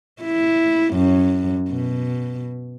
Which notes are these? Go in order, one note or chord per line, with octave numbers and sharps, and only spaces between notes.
E4
F#2
B2